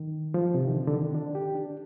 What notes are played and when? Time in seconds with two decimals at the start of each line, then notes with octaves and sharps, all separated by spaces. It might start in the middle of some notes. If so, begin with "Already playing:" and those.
Already playing: D#3
0.34 F3
0.54 C3
0.67 D#3
0.74 D3
0.87 D3
0.95 D#3
1.15 D4
1.35 G4
1.55 D4